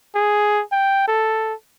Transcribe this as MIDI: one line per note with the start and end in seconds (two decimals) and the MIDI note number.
0.15 0.63 68
0.72 1.07 79
1.07 1.54 69